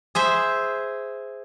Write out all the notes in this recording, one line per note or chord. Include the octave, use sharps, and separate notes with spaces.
G#4 C5 E5